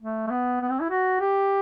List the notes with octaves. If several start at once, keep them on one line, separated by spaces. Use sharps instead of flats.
A3
A3
B3
B3
C4
E4
F#4
G4